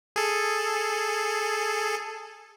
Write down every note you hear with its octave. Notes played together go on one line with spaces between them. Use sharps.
G#4 A4